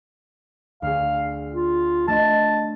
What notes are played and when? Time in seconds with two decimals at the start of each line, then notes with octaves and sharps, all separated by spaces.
0.82 D2 G#4 F5
1.53 F4
2.08 A3 D4 D#5 A5